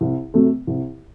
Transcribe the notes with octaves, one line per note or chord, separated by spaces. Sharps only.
C2
C3 F#3 A3
C2